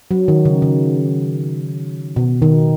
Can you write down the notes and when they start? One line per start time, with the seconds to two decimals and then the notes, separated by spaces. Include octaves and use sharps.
0.11 F#3
0.28 D#3
0.45 C#3
0.62 C#3
2.16 B2
2.42 D#3